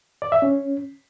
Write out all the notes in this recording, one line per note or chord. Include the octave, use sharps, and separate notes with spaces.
D5
E5
C#4